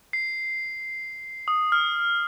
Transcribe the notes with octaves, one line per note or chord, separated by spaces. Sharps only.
C7
D#6
F6